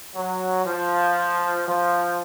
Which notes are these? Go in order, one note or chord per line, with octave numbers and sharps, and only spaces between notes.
F#3
F3
F3